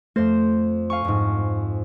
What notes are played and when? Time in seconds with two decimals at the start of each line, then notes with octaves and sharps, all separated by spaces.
0.16 F2 A3 C5
0.90 F5 G#5 C#6
1.05 F2 G#2